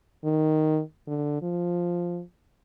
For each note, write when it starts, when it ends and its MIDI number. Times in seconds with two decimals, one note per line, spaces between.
0.24 0.80 51
1.07 1.42 50
1.42 2.21 53